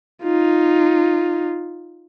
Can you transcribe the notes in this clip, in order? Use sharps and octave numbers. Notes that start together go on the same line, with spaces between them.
D#4 F4